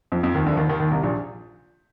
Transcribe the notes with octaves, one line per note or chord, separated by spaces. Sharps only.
F2 F3
F2 F3
D#2 D#3
D2 D3
F3
D#2 D#3
D#2 D#3
D#2 D#3
C2 C3
A#1 A#2